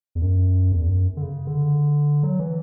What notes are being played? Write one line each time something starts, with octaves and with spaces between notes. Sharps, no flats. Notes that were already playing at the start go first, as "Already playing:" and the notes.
E2
F#2
E2
F#2
D3
C#3
D3
F#3
E3